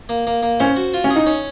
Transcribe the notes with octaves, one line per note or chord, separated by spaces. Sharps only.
A#3
A#3
A#3
C#4 C5
F#4
F4
C#4
G#4
D#4
C#4